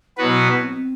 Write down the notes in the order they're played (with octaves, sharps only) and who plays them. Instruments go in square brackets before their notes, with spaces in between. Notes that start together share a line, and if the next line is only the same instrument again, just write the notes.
[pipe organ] B2 F#3 B3 F#4 B4 [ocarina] E4
[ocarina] B3
C4